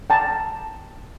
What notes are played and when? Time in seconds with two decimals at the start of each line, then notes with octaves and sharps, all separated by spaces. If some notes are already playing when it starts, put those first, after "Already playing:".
0.10 G5 A5 A#5